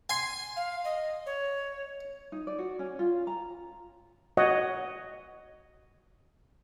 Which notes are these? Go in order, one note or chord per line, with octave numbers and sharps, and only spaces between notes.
G#5 C6
F5
D#5
C#5
D#4
D5
F#4
C#4
F4
A#5
F#4 C#5 D#5 F#5